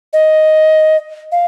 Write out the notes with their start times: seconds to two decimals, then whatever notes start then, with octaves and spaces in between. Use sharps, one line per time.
0.13 D#5
1.32 F5